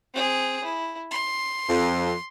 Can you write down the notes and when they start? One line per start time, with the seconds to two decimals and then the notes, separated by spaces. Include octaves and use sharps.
0.14 C4 G#4
0.64 E4
1.11 C6
1.69 F2